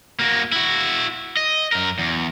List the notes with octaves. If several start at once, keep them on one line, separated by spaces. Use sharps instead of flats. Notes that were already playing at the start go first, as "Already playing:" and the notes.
A#3 F#4
E4 F#4
D#5
F#2 A#4
E2